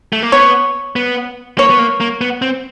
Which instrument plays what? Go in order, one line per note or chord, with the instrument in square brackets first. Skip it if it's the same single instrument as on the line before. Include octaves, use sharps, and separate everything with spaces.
[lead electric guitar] A3
A#3
[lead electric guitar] B3 [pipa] C#5
[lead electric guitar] B3
[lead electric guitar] A#3 [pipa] C#5
[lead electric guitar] B3
A#3
A#3
B3
C4